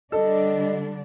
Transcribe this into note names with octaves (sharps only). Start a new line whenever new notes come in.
D3 G3 D4 A4 D#5